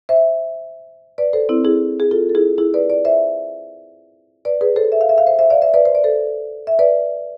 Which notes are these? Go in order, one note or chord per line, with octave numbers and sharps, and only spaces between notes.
C5 E5
B4 D5
A4 C5
C4 E4
E4 G#4
G#4
F4 A4
A4
E4 G#4
E4 G#4
B4 D5
B4 D5
C5 E5
B4 D5
G#4 B4
A4 C5
E5
F5
E5
F5
C5 E5
C5 E5
D5 F5
C5 E5
B4 D5
C5
D5
A4 C5
E5
B4 D5